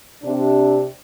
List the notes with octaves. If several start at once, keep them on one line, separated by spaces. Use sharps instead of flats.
C3 D4